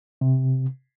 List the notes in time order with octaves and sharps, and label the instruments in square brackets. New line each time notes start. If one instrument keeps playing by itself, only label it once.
[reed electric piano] C3